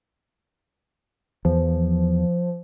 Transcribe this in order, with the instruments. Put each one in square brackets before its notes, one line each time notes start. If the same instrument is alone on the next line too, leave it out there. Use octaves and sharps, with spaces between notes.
[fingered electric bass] E2 [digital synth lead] F3